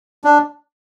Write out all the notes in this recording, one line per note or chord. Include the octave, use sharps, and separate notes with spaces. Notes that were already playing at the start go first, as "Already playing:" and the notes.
D4